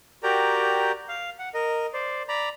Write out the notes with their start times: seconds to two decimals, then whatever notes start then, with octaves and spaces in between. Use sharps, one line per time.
0.23 F#4 G4 A#4 D5 G5 A#5
1.08 F5
1.39 F#5
1.54 A#4 D#5
1.93 C5 D5
2.28 D5 A#5 B5